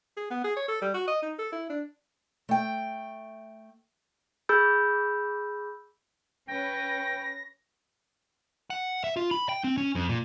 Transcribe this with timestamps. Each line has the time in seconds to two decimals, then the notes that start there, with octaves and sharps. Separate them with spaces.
0.17 G#4
0.31 B3
0.44 G#4
0.57 C#5
0.68 A4
0.82 G3
0.94 F#4
1.08 D#5
1.22 D#4
1.39 A4
1.52 E4
1.70 D4
2.49 A3 G5
4.49 G#4 B5 E6 G6
6.48 C#4 B4 G5 A#6
8.70 F#5
9.04 E5
9.17 F4
9.31 B5
9.49 G5
9.64 C4
9.78 C#4
9.95 F2
10.09 A#2